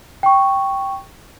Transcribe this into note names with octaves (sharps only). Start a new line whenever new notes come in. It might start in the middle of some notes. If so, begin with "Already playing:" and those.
G5 C#6